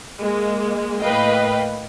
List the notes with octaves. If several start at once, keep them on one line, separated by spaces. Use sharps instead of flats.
G#3 A#3
A2 A#3 B4 D#5 F5 G5